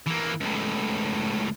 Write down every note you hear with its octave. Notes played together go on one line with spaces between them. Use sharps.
E3 A#3
C#2 A2